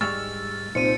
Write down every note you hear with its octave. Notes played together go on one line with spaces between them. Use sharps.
G#2 G3 G#3 C#6 E6 F6 A6
C2 A#2 D#4 C5 C#7 D#7